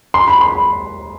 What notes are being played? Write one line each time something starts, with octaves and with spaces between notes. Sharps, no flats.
C6
B5
C6
B5